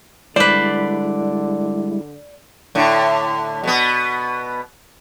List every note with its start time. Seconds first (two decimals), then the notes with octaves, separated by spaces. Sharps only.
0.36 D3 G3 G#3 E4 B4 C5 D5
2.75 A2 D3
3.63 B2 B3